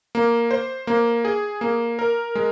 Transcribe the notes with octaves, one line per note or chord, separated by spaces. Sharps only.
A#3
C5
A#3
G#4
A#3
A#4
G#3